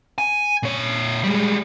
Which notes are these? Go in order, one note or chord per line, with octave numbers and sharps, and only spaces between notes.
G#5
A#2 C#5
G3 G#3